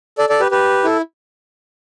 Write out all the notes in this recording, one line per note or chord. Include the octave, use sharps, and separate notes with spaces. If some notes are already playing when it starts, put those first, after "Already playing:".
A4 D5
A4 D5
G4 B4
G4 B4
E4 A4